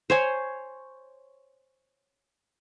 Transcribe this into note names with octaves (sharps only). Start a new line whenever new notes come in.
C5 C#5 G#5